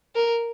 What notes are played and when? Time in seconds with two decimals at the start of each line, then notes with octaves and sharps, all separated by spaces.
0.15 A#4